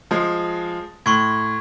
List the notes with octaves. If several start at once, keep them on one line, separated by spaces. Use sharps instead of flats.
F3 G#3
A2 C6 C#6 G#6